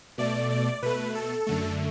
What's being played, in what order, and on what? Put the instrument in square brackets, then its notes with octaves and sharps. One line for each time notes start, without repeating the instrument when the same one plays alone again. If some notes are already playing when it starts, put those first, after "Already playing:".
[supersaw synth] B2 A3 D5
D5
B2 A3 B4
A4
F#2 D3 A3